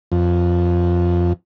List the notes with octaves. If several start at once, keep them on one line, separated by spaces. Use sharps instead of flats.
F2